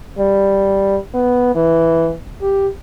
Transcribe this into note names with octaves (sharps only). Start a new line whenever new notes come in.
G3
B3
E3
G4